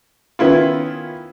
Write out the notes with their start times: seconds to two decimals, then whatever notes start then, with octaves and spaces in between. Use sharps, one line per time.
0.39 D#3 B3 C#4 E4 F4